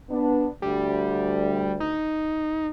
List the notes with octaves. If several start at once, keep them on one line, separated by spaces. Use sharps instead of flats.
B3 D4
D2 G3
D#4